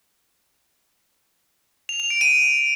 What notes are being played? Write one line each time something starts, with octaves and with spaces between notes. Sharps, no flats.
F7
F7
D7
D#7